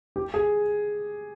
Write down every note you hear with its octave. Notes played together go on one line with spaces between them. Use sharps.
G4
G#4